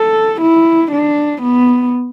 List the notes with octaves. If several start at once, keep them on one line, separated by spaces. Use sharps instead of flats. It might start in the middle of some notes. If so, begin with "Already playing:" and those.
Already playing: A4
E4
D4
B3